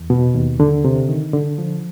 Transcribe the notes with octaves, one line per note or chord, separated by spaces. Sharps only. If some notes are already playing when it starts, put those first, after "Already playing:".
Already playing: E2
B2
D#2
D3
C3
D#3
D3
F3